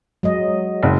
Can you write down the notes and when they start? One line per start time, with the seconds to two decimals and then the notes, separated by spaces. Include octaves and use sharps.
0.23 F#3 G#3 D#5
0.83 F#1